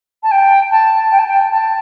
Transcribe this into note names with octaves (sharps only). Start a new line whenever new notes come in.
A5
G5
A5
G5
A5
G5
A5